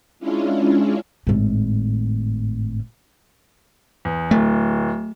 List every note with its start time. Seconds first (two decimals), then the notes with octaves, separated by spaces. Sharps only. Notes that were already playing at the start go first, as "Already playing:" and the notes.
0.20 G#3 C#4 D4 E4 F4
1.27 G#1 A2
4.05 E2
4.31 D1 A3